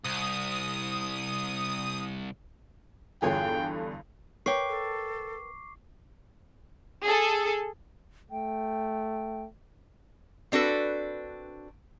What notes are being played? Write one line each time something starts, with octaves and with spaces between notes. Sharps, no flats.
C2 D#6
E2 G2 D3 F4 G#4 C#5 G5
A#4 B4 C#5 G5 C#6 D6 C7
A4
G#4 A4
A3 G5
C4 D4 F#4 A4 B4